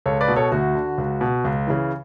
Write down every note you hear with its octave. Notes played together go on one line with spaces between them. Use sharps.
C#2 A4 C#5
B4 D5
B2
A4 C#5
D2 F#4
D3
C#2
B2
C#2
C#3 E3